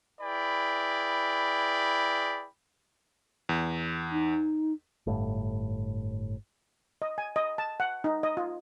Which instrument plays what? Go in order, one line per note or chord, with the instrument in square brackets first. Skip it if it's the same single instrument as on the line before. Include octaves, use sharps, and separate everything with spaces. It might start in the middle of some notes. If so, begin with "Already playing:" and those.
[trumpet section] E4 G#4 B4 D5 G5 B5
[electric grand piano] E2
[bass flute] D#4
[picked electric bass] G1 A2
[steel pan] D#5
G#5
D#5
A5
F#5
D#4
D#5
F4